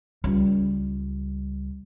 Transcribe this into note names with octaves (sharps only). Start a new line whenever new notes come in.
C#2 G3